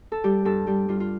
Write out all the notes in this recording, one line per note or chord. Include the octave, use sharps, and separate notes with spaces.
A4
G3 G4
G2 A4
G3 G4
G3 F4
F4